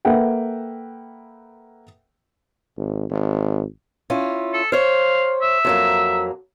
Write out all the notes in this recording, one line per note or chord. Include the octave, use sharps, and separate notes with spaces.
A#3 A4 B4 E5 F#5 G5
G#1
G#1
C#4 E4 F4
A4
C5 C#5 F5
E5
F2 F#3 A#3